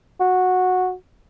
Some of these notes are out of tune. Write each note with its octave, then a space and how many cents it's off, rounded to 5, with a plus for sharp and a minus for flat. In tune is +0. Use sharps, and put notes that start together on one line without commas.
F#4 -10